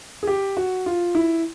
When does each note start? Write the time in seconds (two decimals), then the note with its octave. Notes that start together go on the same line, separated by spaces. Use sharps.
0.23 G#4
0.27 G4
0.57 F#4
0.86 F4
1.15 E4